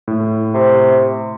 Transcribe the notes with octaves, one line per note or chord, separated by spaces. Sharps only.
A2
C3